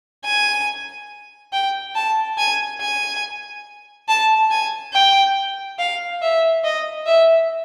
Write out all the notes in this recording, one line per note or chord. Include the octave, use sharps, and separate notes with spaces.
G#5
G5
A5
G#5
G#5
A5
G#5
G5
F5
E5
D#5
E5